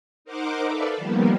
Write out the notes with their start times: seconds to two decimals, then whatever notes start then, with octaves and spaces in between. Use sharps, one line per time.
0.25 D#4 A#4 C5 F#5 D6
0.65 A4 B4 D5 E5 F5
0.97 D#3 F3 G3 A#3 B3